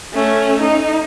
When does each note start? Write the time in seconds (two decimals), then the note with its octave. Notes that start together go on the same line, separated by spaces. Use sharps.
0.13 A3 C#4
0.60 D#4